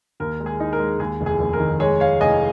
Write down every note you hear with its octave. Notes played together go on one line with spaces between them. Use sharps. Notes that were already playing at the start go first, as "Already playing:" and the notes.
D#2 A#4
G#3
G#4
D#4
A#4
G#3
D#2 G#4
F1
G#4
F1
A#4
D#3
G#3 G#4 C#5
G#3 C#5 F5
F1 D#5 G#5